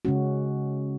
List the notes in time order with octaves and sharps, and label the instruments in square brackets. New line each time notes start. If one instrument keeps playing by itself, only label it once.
[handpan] C#3 G#3 C#4 F#4